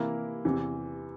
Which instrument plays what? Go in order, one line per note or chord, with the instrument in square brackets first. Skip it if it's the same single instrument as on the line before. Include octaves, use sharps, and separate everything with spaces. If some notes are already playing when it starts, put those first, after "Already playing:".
Already playing: [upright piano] C3 E3 A#3 E4 A#4
E2 C3 E3